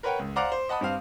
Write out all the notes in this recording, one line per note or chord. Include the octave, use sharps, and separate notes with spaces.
A#4 B4 C#5 F#5 G5
C#2
C5 D5 F5 F#5 A#5 D6
C5
D#5 F#5 A5 B5 D#6
G2 C4 F5